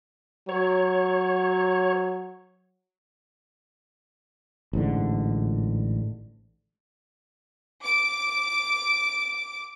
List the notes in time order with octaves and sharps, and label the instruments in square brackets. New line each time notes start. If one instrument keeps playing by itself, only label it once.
[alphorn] F#3 [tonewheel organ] C#5
[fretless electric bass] A1 G#2 D3
[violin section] D6 D7